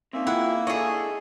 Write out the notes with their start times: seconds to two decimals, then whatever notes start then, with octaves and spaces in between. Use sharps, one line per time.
0.13 A#3 C4 C#4 D#4 E5
0.27 E4 F4 G#4 F#5 G5
0.67 D4 E4 G#4 A4 C#5 D#5